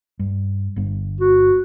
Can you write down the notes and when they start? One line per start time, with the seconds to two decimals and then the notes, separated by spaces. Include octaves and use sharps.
0.19 G2
0.76 G1 G2
1.21 F#4